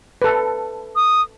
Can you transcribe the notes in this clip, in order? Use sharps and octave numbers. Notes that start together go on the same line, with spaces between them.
A4 B4
D#6